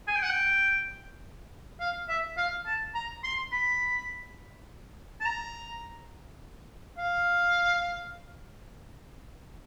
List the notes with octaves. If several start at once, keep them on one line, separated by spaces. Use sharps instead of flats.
G#5
G5
F#5
G5
F5
E5
F5
A5
A#5
C6
B5
A5
A#5
F5